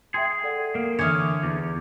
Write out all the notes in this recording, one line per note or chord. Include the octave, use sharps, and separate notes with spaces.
G#4 E5 G5 C6
A4 D5 F#5
A#3
D3 E3 C#5 G#5 D6 D#6 F6
D6 G#6
E2 D6